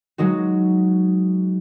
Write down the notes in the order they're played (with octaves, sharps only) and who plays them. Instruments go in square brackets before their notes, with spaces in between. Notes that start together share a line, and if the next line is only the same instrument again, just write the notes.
[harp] F#3 G#3 D#4 F#4